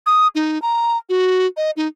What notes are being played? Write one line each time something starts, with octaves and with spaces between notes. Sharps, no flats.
D#6
D#4
A#5
F#4
D#5
D#4